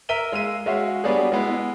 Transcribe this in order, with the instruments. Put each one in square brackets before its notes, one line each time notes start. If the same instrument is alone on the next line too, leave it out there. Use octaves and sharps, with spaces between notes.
[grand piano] A#4 E5 B6 D#7 G7
G#3 F5 E6 D#7
G#3 C#4 F#4 E5 F5
F#3 G3 B3 D4 F#4 G#4
G#3 B3 E4